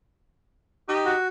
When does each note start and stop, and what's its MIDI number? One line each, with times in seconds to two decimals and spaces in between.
0.89 1.14 63
0.89 1.14 67
1.05 1.28 66